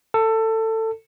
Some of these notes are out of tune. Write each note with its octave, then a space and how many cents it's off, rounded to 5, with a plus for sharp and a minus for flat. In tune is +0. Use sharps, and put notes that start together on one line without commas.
A4 +20